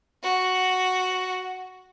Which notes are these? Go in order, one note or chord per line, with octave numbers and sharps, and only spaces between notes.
F#4